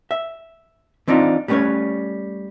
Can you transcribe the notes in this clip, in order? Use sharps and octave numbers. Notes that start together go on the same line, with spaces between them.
E5
E3 C4 D4 D#4 F4
G3 A3 B3 C#4 B4 C#5